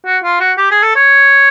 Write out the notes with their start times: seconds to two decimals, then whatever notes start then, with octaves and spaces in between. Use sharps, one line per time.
0.06 F#4
0.23 F4
0.40 F#4
0.58 G4
0.71 G#4
0.83 A4
0.96 C#5